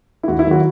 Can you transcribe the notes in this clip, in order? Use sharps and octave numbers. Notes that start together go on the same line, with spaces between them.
E4
D#2 F#4
E4
D#3 F#3
F#4